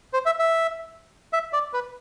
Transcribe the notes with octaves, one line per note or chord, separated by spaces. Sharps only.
C5
E5
E5
E5
D5
B4